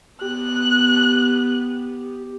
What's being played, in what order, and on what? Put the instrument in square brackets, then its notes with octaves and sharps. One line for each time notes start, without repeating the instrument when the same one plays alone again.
[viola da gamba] B3 [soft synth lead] G4 [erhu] F#6